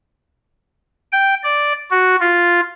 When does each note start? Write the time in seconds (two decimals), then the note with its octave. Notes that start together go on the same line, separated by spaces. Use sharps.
1.13 G5
1.44 D5
1.91 F#4
2.20 F4